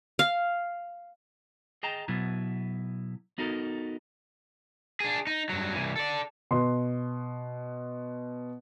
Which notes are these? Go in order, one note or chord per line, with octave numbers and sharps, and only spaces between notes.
F5
G#4 D#5 G5 A5 A#5
B2 F#3 B3 E4
B3 D#4 F#4 A4 A#4
D4 G#4
D#4
G2 F#3
C2 E3
A4 D5
B2 B4 C6